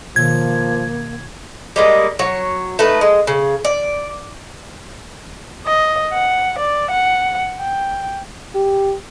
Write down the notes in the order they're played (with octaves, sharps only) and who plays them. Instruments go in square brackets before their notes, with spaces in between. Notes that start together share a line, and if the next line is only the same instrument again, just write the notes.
[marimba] B2 D#3 [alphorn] F3 [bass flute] A#3 [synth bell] G#6
[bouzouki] G3 G#3 A#3
F#3 C#5
A3 D#4 B4
G#3
C#3
D5
[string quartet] D#5
F#5
D5
F#5
G5
[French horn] G4